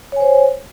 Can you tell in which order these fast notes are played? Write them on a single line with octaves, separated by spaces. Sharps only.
C#5 G#5 C5